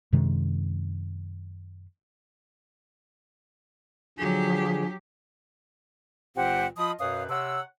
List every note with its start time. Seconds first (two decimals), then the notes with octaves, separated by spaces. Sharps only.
0.13 F#2 C3 D#3 G#3
4.19 D3 F3 F#3 G4 G#4
6.36 C#2 A#2 E3 C4 G4 F#5
6.77 F3 F4 D#5 B5 D#6
7.00 F#2 B2 B4 C#5 F5 D#6
7.29 C3 C#5 F#5 E6